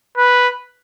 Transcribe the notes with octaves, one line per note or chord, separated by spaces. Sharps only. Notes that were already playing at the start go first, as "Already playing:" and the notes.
B4